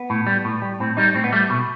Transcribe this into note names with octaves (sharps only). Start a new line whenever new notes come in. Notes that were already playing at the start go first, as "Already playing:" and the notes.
Already playing: B3
A2
G3
A2
G3
A2 C4
G3 D#4
A2 C4
B3
G3 A3
B2